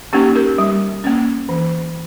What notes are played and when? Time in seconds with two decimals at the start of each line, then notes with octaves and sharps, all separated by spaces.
0.13 A#3 C#4 D#4 G4
0.35 G4 A#4
0.58 G3
1.04 A#3 C#4
1.49 E3